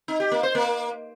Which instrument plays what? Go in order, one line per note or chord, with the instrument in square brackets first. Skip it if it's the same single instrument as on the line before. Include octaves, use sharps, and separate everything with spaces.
[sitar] D#4
G4
A#3
C5
A#3